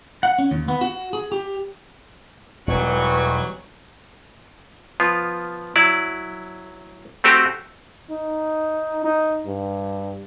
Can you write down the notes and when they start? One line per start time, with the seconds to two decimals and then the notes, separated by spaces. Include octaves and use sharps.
0.23 F#5
0.39 C#4
0.51 D#2
0.68 B3
0.81 F#4
1.13 G#4
1.32 G4
2.67 E1 G#2 B2 E3 F#3 G3 C#6
5.00 F3 B3 F4
5.76 F#3 E4 D5
7.24 A3 C4 F#4 G4 C5
8.11 D#4
9.04 D#4
9.47 G2